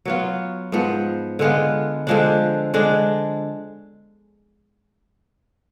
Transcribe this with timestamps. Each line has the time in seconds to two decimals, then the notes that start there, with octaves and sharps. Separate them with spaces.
0.05 F#3 B3 F4
0.72 G#2 F3 B3
1.39 D3 G#3 B3 F4
2.07 D3 F3 G#3 D4
2.74 D3 G#3 D4